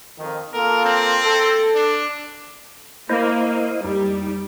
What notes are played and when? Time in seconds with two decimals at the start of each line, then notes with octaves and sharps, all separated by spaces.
0.19 F2 D#3
0.53 A#3 F4 A4 A#4
0.85 C4
1.24 A4
1.75 D4
3.09 A#3 E4 C5 D#5
3.84 F2 G3 D#4